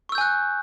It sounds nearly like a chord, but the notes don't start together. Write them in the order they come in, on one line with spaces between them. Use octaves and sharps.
C#6 E6 G6 G#5 F#6